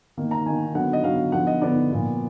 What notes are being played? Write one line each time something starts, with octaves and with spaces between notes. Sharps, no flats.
D#3 A#3
A#5
D#3 A#3 G#5
D3 F#3 B3 F#5
D#5
D3 F#3 B3 F5
D3 F3 B3 F#5
D#5
D3 F3 B3 D5
A#2 F3 B3